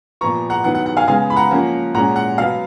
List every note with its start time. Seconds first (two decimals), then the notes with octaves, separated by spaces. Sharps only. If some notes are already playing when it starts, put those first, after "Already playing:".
0.21 A#2 F3 B3 A#5 C#6
0.50 F#5 A#5
0.64 D#3 F#3 B3 F#5
0.75 F#5
0.86 F#5
0.97 F5 G#5
1.07 C#3 G#3 B3 F5 G#5
1.30 B5
1.36 F#5 A#5
1.51 F3 A#3 C#4
1.95 A#2 G#3 C#4 F#5 A#5
2.16 F#5
2.38 B2 F#3 B3 F5